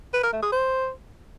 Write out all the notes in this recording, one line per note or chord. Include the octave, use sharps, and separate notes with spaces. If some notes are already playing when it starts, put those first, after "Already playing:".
B4
A#4
A3
G#4
C5